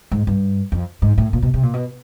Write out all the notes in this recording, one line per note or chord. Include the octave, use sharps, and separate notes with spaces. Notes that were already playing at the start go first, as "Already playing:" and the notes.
G#2
G2
F2
G#2
A2
A#2
B2
C3
A#2
B2